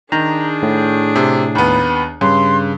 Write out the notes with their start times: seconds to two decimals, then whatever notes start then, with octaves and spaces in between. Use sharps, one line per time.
0.12 D#3 D4 G#4 A#5
0.63 A2
1.16 C3
1.55 D#2 B3 B5
2.21 G2 C#3 C6